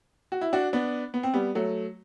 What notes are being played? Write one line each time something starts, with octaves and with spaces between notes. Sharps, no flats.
F#4
E4
D4 F#4
B3 D4
B3
C4
G3 B3
F#3 A3